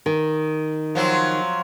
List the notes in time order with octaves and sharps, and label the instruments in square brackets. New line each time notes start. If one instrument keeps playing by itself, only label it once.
[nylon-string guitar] D#3
[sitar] F3 F#3 C4